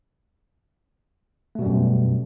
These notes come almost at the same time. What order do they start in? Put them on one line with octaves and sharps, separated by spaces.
A3 B2 G3 F#2